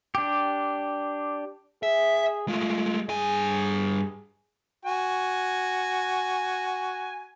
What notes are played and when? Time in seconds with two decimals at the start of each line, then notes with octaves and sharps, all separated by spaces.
0.15 D4 G4
1.83 G#4 E5
2.48 G#3 A3 F4
3.09 G2 G#4 G#5
4.85 F#4 G#5